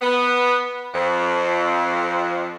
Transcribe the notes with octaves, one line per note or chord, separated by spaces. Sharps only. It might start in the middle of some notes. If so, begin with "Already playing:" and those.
B3
F2